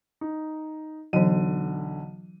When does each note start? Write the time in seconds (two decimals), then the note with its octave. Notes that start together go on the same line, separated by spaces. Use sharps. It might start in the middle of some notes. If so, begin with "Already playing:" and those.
0.21 D#4
1.13 B1 D3 E3 F#3 D#7